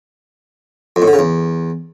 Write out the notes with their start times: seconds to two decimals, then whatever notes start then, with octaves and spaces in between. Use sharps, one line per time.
0.96 F2
1.02 A2
1.08 D3
1.13 C#3
1.19 E2